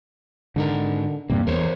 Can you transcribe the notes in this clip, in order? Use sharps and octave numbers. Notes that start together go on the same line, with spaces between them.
G#2 D3 D#4 A#4
E2 G2 C3 A#3
E2 A#4 C5 C#5